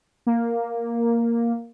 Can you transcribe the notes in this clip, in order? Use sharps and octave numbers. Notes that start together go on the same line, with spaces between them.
A#3